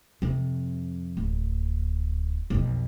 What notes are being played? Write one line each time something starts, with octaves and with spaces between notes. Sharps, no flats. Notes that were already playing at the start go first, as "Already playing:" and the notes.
F2 C3
D1
B1 F2